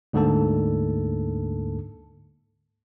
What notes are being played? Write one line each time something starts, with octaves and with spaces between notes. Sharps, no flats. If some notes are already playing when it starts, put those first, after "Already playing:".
D2 G#2 D3 A#3 A4 A5